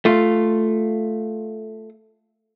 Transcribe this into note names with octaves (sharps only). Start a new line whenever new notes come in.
A3 F4